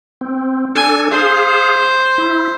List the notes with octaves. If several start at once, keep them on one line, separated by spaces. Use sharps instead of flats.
C4
D4 A4 G#5
G#4 C5 F5
E4